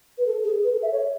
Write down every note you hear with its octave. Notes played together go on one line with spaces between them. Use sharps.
B4
A4
G#4
B4
A4
E5
C#5